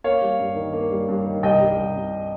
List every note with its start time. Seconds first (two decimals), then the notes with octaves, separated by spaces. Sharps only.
0.04 A#3 C#5 F5
0.22 G3
0.40 G2
0.56 D#3
0.73 A#3
0.91 G3
1.09 G2
1.26 D#3
1.43 C2 D#5 G5
1.60 G3
1.78 C2
1.95 C3